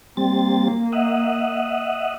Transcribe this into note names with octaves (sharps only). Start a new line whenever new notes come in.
G3 A#3 C4 A6
D#5 E5 F#5